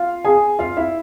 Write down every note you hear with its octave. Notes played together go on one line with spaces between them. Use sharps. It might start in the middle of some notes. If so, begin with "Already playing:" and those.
Already playing: F4 F5
G#4 G#5
F4 F5
E4 E5